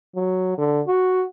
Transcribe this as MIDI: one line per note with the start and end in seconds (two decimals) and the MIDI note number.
0.15 0.57 54
0.58 0.81 50
0.87 1.25 66